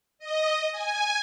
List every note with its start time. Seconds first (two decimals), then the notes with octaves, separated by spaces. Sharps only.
0.19 D#5
0.72 G#5